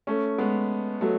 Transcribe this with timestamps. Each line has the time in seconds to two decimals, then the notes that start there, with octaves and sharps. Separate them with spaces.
0.07 A3 C#4
0.38 G#3 B3
1.01 F#3 A3